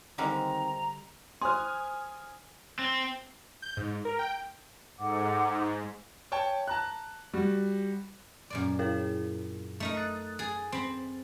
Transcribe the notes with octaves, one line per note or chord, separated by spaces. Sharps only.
D3 D#3 G3 G#3 C4 A#5
C5 G#5 C6 D#6 F6
C4
G6
G#2
A#4
G5
G#2 A4 F#5 D6
C#5 G5 A5
A5 A#5 F#6
G3 F#4
F#2 A#2 D5
E4 G#4 A#4
A3 D#4 A#4
D#6 F#6 A6
G#4 A6
C4 B5